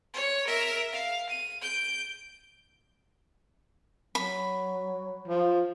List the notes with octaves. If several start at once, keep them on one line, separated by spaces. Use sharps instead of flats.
C#5
A#4 E5
F5
D#7
G6 D7
F#3 B5
F3